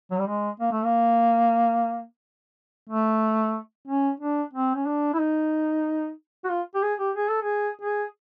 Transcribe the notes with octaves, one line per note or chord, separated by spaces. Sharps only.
F#3
G3
G#3
A#3
A3
A#3
A3
C#4
D4
C4
C#4
D4
E4
D#4
F#4
F4
G4
G#4
G4
G#4
A4
G#4
G#4